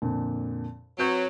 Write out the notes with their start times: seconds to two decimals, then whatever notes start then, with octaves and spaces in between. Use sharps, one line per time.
0.02 F2 A#2 D3
0.98 F#3 C4 B4 G6